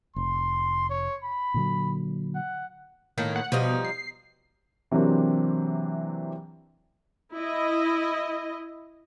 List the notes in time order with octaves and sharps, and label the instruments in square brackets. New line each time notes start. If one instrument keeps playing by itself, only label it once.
[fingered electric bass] F1 [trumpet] C6
[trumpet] C#5
B5
[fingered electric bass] A#2 D3 F#3
[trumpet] F#5
[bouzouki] A2 D#3 A#3
[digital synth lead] F#5
[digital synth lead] B2 [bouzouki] F3 G3 D#4
[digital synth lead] C7
[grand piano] C3 E3 F#3 A#3 C4 D4
[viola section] E4 D#5